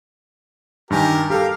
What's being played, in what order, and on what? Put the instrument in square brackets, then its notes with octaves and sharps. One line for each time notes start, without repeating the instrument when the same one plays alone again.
[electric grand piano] G2 D#3 G#5 [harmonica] G4 A#4
[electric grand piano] G4 A4 [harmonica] A#4 F5